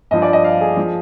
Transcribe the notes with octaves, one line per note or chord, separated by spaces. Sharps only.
G2 F3 D#5
D5
D#5
F5
G#4
F3